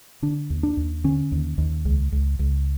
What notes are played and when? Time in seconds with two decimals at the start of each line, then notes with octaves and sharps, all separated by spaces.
0.22 D3 D4
0.50 D#2
0.63 D4
0.77 D#2
1.04 D3 C#4
1.32 D#2
1.58 D#2
1.85 C#2
2.12 C#2
2.39 C#2